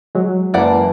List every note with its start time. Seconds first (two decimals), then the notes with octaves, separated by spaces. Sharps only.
0.15 F#3 G#3
0.54 F#1 E3 A#3 D5 F#5 A5